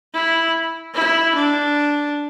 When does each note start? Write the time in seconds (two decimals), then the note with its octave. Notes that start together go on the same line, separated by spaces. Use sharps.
0.14 E4
0.94 E4
1.35 D4